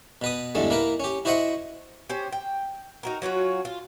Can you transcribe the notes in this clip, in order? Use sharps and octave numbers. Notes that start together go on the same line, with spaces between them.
B2 B4 D#6
E2 G2 D3 G#3 A3
A#3 E4 A#4 B4
C#4 G4
E4 F#4 C5 D#5 E5 F#5
C#4 G4 C5
G5
D#4 F#4 A#4
F#3 C#4 F4 F#4
F4